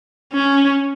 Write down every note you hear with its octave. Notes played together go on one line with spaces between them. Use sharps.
C#4